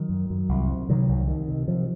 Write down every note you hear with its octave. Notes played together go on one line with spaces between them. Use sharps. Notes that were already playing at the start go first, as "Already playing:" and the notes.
Already playing: D#3 F#3
F#2
F#2
C2
C3
C3 D#3 F#3
C2
C3 D#3
C3
C3 F3